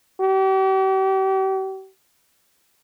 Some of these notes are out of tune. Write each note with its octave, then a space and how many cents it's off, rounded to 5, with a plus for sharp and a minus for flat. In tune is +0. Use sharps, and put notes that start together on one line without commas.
G4 -40